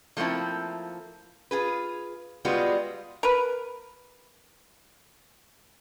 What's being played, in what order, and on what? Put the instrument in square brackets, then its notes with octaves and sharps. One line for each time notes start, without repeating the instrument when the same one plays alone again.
[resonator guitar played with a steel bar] F3 A3 A#3 C4 E4
F4 G#4 B4
G3 G#3 B3 F4 F#4
[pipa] A#4 B4